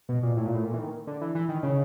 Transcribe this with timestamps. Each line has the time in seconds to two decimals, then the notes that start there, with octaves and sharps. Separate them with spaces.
0.09 B2
0.23 A#2
0.37 A2
0.46 A#2
0.55 A2
0.65 A#2
0.74 E3
0.79 D#3
1.07 D3
1.21 E3
1.35 E3
1.49 D#3
1.63 C#3